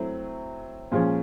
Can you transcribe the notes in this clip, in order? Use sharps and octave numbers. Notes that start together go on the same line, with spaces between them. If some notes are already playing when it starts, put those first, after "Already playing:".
Already playing: F#3 A3 C4 E4
A#2 F3 G#3 C#4